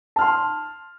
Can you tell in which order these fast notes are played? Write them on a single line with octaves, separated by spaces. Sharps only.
A5 F6 C6